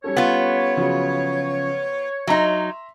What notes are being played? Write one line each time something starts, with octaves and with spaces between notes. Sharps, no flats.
G3 C#4 A4 C#5
B3 F4
C#3 F3 F#3
F#3 D#4 E5 A#5 C6